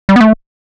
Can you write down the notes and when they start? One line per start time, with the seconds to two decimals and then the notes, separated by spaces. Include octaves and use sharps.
0.09 G3
0.16 B3
0.21 A3